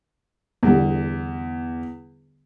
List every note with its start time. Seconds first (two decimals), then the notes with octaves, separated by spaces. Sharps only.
0.63 E2 D3 G3 B3